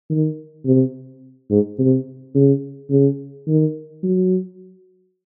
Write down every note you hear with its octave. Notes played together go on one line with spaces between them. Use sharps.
D#3
C3
G#2
C3
C#3
C#3
D#3
F#3